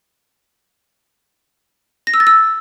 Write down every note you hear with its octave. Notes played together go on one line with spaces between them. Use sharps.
A#6
E6
A6
E6